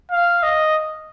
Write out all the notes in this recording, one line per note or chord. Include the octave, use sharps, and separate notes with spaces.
F5
D#5